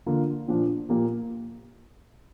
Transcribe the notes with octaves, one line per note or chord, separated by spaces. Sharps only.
D3 A#3 F4
A#2 F3 D4 F4
A#2 F3 A#3 G4